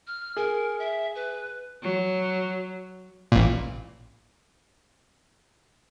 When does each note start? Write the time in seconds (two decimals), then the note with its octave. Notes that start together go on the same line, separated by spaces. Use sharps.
0.07 F6
0.37 G#4 A#4
0.79 E5
1.15 B4
1.83 F#3
3.32 A1 A#2